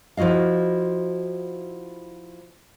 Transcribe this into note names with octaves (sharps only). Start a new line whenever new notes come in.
F3 E4 F#4 D#5 F5